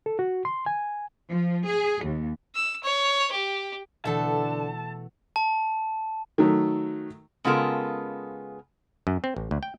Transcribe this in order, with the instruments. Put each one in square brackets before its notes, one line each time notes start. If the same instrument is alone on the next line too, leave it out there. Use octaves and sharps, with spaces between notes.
[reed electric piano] A4
F#4
C6
G#5
[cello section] F3
G#4
D#2
[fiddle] E6
C#5
G4
[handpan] B2 E3 F#5 [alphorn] D3 [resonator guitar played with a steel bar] A3 A4 [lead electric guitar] A5
[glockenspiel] A5
[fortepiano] D#3 F#3 A3
[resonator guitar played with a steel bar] C#3 G#3 B3 F4 A4 A#4
[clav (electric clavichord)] F#2
C4
A1
D2
G5